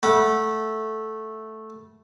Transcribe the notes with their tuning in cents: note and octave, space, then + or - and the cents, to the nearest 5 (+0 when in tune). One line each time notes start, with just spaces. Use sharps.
A3 -5 F#5 +0 B5 -25